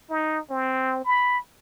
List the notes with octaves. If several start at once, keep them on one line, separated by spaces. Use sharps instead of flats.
D#4
C4
B5